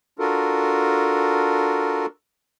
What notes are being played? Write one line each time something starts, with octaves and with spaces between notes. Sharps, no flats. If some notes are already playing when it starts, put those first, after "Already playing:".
D4 F4 F#4 A4 A#4